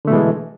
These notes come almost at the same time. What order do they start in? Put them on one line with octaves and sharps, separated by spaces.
D3 A3 B2 E3 G#3